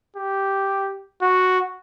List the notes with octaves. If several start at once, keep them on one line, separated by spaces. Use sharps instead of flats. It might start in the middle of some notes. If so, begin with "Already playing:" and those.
G4
F#4